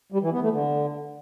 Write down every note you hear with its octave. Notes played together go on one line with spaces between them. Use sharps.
G3
E3
B3
A3
D3